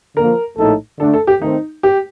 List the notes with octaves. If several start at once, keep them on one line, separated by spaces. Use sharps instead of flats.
D3 F3 A#3 A#4
A#1 A2 A3 D#4 A4
D3 A3 D4 A4
A4
G4
D#3 A3 C4 D#4
G4